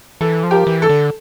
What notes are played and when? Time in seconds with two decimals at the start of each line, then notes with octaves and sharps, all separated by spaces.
0.21 E3 A4
0.43 F3
0.51 G4 A#4
0.67 E3
0.82 A4
0.89 D3